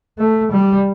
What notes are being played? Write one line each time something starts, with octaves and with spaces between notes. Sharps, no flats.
A3
G3